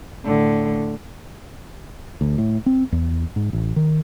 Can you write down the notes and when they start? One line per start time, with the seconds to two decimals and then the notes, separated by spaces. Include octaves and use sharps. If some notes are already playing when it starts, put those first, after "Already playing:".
0.25 A2 D3
2.21 D2
2.38 A2
2.66 C4
2.92 E2
3.36 G#2
3.53 A1
3.76 D#3